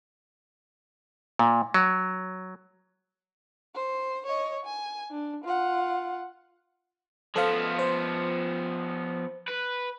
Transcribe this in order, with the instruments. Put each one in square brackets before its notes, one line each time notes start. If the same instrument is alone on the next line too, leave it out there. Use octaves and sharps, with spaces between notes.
[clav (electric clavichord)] A#2
F#3
[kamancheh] C5
C#5 D#5
G#5
D4
F4 F#5
[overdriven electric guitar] F3 B3 [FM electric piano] A4 C5 F5
[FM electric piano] C5
[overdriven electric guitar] B4